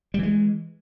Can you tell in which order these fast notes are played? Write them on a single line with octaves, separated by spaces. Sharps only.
G3 E3 G#3